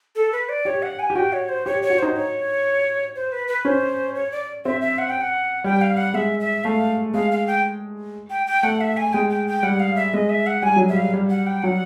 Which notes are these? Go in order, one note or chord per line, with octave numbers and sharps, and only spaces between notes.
A4
B4
D5
G4 C#5
F#5
G#5
G4
F#4 G5
C#5
C5
G4 C#5
C#5
F#4
D#4 C5
C#5
C5
B4
B4
C#4 C5
C#5
D5
C4 E5
E5
F#5
G5
F#5
G3 G5
F5
F#5
G#3 E5
E5
A3 F5
G#3 F5
F5
G5
G5
G5
A3 F#5
E5
G#5
G#3 G5
G5
G5
G3 F#5
F5
E5
G#3 D#5
E5
F#5
G3 G#5
F#3
G3 E5
F5
G3
F#5
G5
F#3 F#5